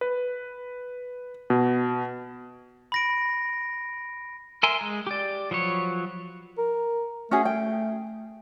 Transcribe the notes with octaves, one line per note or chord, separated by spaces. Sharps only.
B4
B2
B5 A#6 D7
A#4 E5 G#5 C6
G#3
G4 D5
F3 F#3 B4 C#5
A#4
A3 C#4 F#4 G#4
G5